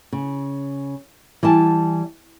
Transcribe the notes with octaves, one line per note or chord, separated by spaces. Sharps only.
C#3
E3 G3 G#5 A5